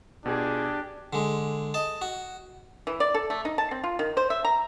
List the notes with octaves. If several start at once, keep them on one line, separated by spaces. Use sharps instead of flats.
B2 D4 F4 G4 G#4
D3 G#3
D#5 A5
F#4
E3
D5
A4
A3
D#4
A5
C4
F4
D#3
C5
E5
A#5